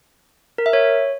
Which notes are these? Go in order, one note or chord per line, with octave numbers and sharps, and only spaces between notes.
A#4
E5
C#5